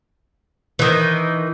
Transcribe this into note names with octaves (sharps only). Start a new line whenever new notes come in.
D#3 E3